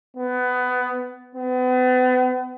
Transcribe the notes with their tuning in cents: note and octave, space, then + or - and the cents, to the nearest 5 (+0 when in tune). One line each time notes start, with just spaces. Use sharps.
B3 +20
B3 +40